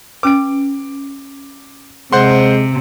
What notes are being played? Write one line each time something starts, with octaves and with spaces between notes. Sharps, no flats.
C#4 B4 D6 D7
C3 G#3 C5 F#5 C6